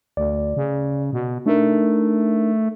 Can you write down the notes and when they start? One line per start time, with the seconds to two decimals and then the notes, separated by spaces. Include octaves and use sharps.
0.17 D2 D5
0.57 C#3
1.13 B2
1.46 A3 D4 D#4 A#4